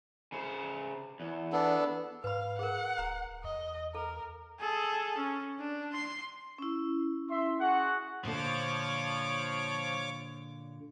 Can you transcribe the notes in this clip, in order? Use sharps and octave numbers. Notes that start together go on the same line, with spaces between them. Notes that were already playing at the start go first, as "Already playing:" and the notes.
C#3 C5
E2
B3 D4 A4
G#2 B4 F5 B5
G#4 A#4 F#5
D1 A#5
E2 D#5
A4 A#4
G#4 A4
C#4
D4
C6 C7
C#4 E4
E5 C6
F#4 G#4 F#5
A#2 D3 F3 C#5 D6